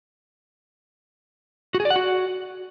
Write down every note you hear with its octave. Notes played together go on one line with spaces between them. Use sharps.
F#4
G#4
D5
F#5
F#4